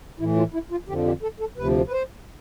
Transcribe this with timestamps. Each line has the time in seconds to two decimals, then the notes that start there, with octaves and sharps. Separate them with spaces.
0.19 A2 E3 E4
0.36 F4
0.53 E4
0.71 F4
0.88 F2 D3 F3 G4
1.05 G4
1.22 A4
1.40 A4
1.57 D2 C3 F3 B4
1.87 B4
1.92 C5